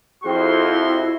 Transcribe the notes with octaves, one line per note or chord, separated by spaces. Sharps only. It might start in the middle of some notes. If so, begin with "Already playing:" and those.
F2 E4 F#4 G#4 C5 G5 C6